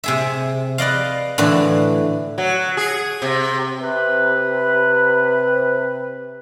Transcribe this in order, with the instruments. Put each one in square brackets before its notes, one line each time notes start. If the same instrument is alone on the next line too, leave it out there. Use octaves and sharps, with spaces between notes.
[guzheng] C3 G#4 E5
B4 D5 D#5 F5
A2 D3 E3 D4
[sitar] F#3
G#4
C3
[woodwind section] C3 B4